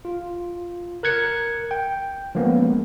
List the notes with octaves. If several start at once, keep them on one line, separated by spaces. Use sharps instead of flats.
F4
A#4 F#6 G#6 C#7
G5
F3 G#3 A#3 B3 C#4